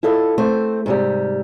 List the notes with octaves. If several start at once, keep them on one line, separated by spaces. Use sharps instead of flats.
E4 F4 A4 D#5
A3 C4 C5
G#2 C3 G3